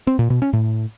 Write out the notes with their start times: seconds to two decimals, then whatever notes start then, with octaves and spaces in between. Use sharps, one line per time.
0.07 C4
0.19 A#2
0.30 B2
0.42 C#4
0.53 A2